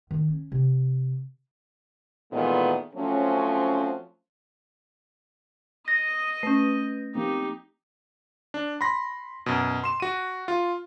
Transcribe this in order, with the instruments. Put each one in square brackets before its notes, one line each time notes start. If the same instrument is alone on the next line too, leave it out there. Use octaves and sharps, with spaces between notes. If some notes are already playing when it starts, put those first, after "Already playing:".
[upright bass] D#3
C#4
C3
[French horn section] A#2 D#3 E3 G#3 A3 B3
F3 F#3 A3 C4 C#4
[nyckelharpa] D#5 D#6 [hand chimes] A#6
[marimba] A3 C#4 [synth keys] B4 G6
[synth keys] F3 A#3 C4 [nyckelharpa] D#4 G4
[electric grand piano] D4
B5 C6 A#6
F#2 B2
C6 E7
F#4 D#7
F4